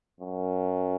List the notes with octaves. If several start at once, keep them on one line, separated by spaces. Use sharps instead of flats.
F#2